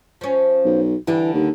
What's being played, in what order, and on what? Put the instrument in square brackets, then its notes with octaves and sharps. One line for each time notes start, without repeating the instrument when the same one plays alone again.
[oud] F3 C#4
[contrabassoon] B1
[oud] D3 G3 D4 [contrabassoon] E3
[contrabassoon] D#2